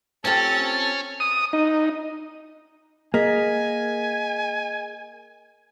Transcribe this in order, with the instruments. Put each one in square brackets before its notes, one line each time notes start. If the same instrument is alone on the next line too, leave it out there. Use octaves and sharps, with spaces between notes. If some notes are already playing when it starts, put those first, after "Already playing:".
[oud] C4 F4 G4 [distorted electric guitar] C#4 [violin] A4 A6
[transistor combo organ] D#6
D#4
[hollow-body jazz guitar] A#3 [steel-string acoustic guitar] G#4 [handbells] D#5 B6 [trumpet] G#5